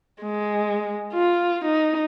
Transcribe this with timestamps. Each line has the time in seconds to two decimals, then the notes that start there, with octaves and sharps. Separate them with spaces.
0.22 G#3
1.13 F4
1.64 D#4